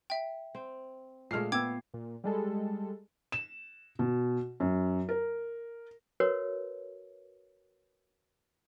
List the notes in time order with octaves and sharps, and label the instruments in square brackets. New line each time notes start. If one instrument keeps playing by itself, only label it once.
[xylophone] E5 G5
[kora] C4
[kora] A#2 A3 [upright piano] G#3 F6 C7
[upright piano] B3 E6 [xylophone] G5 D6 G#6
[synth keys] A#2
G3 G#3 A4
[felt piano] E7
B2
F#2
A#4
[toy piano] F#4 A#4 B4 C#5